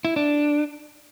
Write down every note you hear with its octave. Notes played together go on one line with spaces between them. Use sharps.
E4
D4